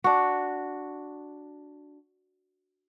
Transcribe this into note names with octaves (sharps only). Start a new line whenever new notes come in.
D4 F#4